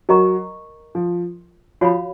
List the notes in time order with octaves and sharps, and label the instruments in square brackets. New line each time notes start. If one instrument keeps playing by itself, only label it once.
[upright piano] F#3 [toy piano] A#4 D#5 A#5 C#6
[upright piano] F3
[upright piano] F3 [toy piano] F#4 C#5 F5 B5